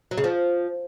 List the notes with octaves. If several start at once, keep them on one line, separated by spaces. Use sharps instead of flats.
F#3
C#3
F3